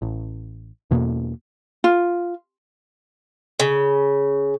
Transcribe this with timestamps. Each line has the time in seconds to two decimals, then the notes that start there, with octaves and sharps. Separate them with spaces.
0.02 A1
0.91 E2 B2 A#3
1.84 F4
3.60 C#3